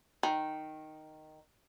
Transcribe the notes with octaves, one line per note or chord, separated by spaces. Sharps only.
D#3